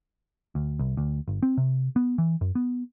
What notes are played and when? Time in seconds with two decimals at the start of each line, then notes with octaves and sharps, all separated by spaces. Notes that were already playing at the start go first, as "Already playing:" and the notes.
0.55 D2
0.79 C2
0.97 D2
1.28 G1
1.43 C4
1.57 C3
1.96 B3
2.18 E3
2.41 F#2
2.55 B3